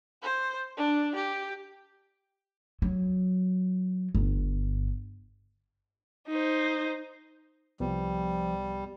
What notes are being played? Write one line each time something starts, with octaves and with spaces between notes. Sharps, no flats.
C5
D4
G4
F#3
G1
D#4 C5
C2 F3 G3 B3